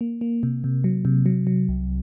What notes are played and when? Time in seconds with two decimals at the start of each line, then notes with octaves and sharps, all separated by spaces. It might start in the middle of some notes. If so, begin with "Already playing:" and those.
0.01 A#3
0.21 A#3
0.43 C3
0.64 C3
0.84 F#3
1.05 C3
1.26 F#3
1.47 F#3
1.69 C2